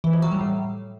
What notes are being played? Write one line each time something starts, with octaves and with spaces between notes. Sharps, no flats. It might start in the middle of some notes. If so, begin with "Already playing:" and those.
E3
F2
F#3
G3
A2